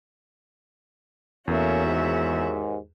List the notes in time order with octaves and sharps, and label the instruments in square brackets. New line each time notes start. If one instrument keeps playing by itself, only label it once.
[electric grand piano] E2 [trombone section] A3 A#3 C#4 [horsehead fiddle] F#4 E5
[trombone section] D#2 G#2